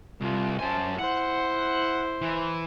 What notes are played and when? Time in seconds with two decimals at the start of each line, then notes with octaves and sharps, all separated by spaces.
0.21 C2 F4
0.59 F#2 C5 G#5 A5
0.98 E4 C5 F#5
2.22 E3